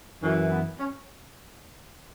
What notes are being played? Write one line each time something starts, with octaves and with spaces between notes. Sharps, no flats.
F#2 E3 C#4
B3
C#4